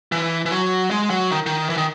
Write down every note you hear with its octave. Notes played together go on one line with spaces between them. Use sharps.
E3
E3
F#3
G#3
F#3
D#3
D#3
E3
D#3